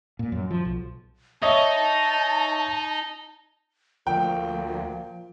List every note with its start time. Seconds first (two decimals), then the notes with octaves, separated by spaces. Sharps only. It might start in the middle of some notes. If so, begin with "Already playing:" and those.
0.19 A#2
0.32 F#2
0.51 F3
0.65 B1
1.42 D#4 C#5 D#5 E5 A5
4.07 D2 A#2 F3 G5